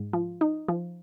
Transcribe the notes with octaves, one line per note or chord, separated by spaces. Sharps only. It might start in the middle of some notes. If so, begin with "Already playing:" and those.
Already playing: G#2
F3
D#4
F3